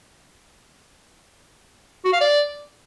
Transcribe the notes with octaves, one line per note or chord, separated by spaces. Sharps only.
F#4
F5
D5